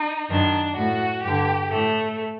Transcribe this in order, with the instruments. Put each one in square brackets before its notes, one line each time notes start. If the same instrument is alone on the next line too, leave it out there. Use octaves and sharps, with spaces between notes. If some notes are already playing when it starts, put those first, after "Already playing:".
Already playing: [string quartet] D#4
F#2 D#3 D4
A2 F#4
G2 D3 G4
A2 A3